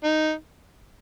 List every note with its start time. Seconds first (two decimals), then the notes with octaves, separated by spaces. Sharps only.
0.04 D#4